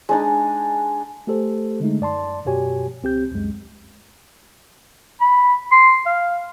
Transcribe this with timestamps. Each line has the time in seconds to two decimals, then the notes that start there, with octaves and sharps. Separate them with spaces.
0.09 G#3 D4 D#4
1.27 A3 G4 A4 C5
1.80 D3 G#3 A3 D#4
2.01 F#2 D5 A5 C6
2.46 F#2 B2 F#4 G4 C#5 G#5
3.03 C#2 C4 G4 G6
3.31 C#2 F#2 G#3
5.21 B5
5.72 C6
6.06 F5